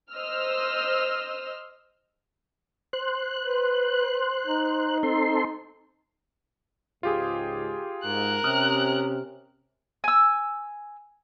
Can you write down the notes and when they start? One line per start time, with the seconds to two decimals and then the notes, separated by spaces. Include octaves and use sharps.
0.11 C5 D#5 E6 F6
2.93 C5 F#6
3.44 B4
4.47 D#4
5.03 C4 A4 C6
7.03 C#2 G#2 F4 G4 G#4
8.04 G#2 A#4 F#6
8.44 C3 C#4 D#6 F6
10.04 G#5 E6